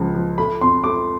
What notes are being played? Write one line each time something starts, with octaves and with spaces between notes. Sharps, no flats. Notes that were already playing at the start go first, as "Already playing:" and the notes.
Already playing: C#2 C#3 F3
F3
A3 B5
F2 C6
A3 D6